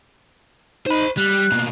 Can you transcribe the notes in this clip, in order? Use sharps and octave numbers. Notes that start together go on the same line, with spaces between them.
D#4 C5 B5
G3 F#6
B2 A#3